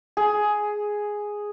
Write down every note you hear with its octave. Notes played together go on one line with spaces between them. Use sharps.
G#4